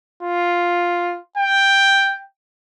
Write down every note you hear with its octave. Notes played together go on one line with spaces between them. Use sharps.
F4
G5